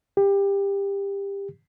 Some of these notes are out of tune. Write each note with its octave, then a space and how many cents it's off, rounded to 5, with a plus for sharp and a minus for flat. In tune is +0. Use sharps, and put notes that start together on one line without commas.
G4 +20